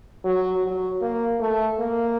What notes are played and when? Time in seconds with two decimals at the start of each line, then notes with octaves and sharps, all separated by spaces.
0.24 F#3
0.64 F#3
1.02 A#3
1.40 A3
1.79 A#3